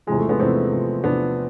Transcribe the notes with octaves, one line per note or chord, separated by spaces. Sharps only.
E2 C3 F3 G#3
A3
G#3 B3
E2 C3 F3 A3 C4
E2 C3 F3
E2 C3 F3 B3 D4